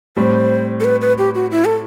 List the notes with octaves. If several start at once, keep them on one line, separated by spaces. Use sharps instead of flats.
A2 G3 C4 C5
A4
B4
B4
G4
F#4
E4
A4